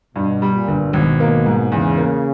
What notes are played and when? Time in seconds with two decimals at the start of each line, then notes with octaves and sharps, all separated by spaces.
0.16 G2 B2
0.42 G3
0.54 A#2
0.68 G1
0.93 G#1 B2
1.20 A#3
1.46 G#2
1.71 E2 C#3
1.98 A#3